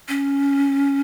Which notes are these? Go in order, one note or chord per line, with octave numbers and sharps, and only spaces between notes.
C#4